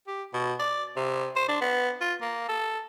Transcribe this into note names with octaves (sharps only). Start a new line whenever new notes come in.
G4
B2
D5
C3
C5
D4
B3
F4
A#3
A4